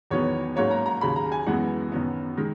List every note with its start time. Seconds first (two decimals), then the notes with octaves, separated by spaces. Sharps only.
0.11 E2 D#3 F#3 B3 C#5
0.56 G#2 F#3 A#3 C#4 C#5
0.71 A#5
0.86 A#5
1.01 D#2 C#3 F#3 B5
1.16 A#5
1.32 G#5
1.46 F#2 E3 G#3 B3 F#5
1.92 F#2 D#3 F#3 B3
2.37 D#3 G#3